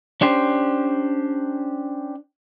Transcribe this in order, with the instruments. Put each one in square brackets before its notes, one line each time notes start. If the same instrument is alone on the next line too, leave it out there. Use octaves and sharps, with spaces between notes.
[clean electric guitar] C#4 D4 G4 C5